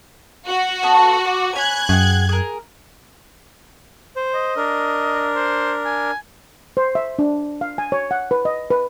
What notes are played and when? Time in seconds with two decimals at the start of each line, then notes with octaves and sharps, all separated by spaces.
0.47 F#4
0.83 B3 A4 C#6
1.25 D6
1.56 C#5 G#5 B5 F#6 G#6
1.89 F#2 G#4 F#5 G5
2.29 G#4 A#4
4.16 C5
4.34 D#5
4.56 D4 A#4
5.35 C5
5.85 G#5
6.77 C5
6.95 E5
7.19 D4
7.61 F5
7.78 G#5
7.92 C#5
8.11 F#5
8.31 B4
8.45 D#5
8.70 B4